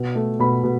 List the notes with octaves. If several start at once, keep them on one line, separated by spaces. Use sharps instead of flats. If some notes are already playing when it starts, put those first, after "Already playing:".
Already playing: B2
A3
B2 B5
B2